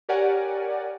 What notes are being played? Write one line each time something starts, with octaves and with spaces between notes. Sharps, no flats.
G4 A#4 C#5 D5 F#5 G#5